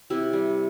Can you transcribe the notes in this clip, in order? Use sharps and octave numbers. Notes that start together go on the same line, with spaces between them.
C3 E4 G4
G3